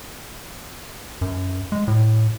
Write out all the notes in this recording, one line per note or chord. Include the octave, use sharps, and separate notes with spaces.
F#2
G#3
A2